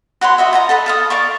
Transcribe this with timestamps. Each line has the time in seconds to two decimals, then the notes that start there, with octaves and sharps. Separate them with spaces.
0.21 F#4 B4 C#5 C6
0.38 F#4 D#5 E5
0.53 F4 D#5 A#5
0.69 A4 D#5 B5
0.86 A4 F5 D#6
1.10 D5 F5 C#6